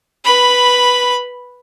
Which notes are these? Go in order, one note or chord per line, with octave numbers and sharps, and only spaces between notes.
B4 B5